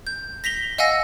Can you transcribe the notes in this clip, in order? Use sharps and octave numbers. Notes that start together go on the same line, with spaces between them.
G6
A#6 B6 F7 G7
D#5 F5 F#5 G#5 E6 A#6